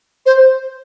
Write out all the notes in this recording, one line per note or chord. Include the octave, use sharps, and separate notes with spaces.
C5